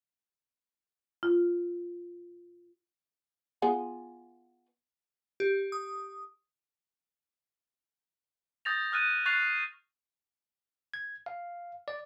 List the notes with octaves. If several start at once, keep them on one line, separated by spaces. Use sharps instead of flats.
F4
B3 F4 G#4
G4
D#6
D#6 G6 A6 A#6 F7
D#6 F6 F#6 A6 D#7
C#6 F#6 A6 C7 F7
G#6
F5
D5